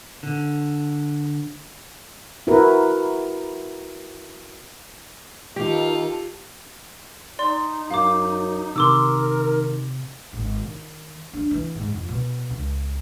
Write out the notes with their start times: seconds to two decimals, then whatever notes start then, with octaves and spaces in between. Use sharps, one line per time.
0.23 D3
2.47 E4 F#4 A#4 B4
5.56 D#3 F4 G4 A4
7.39 D#4 D5 C6
7.90 F#2 F5 D6
8.76 C3 D#3 A#4 C6 D6 E6
10.33 G#1
10.62 D#3
11.33 D4
11.51 E3
11.75 G#2
11.92 F2
12.09 B2
12.50 C#2